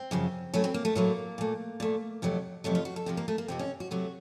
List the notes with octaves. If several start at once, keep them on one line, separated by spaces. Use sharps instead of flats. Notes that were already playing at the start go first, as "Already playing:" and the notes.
Already playing: C4
F#2 C#3 F3
A2 F#3 A3 C#4
C4
A#3
A3
A2 F#3 A3 A#3
A#2 A3
A#2 A3
F2 C3 F#3 A3
F2 C3 F#3 A3
F4
F#4
A4
F2 C3 F3 C4
A#3
A3
A#3
F2 C3 F3 C4
C#4
F#4
C3 F#3 A3 F#4